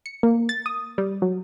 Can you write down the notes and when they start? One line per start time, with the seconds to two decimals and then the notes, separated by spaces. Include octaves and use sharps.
0.06 C#7
0.23 A#3
0.49 A6
0.66 D#6
0.98 G3
1.22 F#3